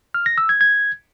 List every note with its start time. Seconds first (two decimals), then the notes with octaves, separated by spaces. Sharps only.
0.14 F6
0.26 A#6
0.38 E6
0.49 G#6
0.61 G#6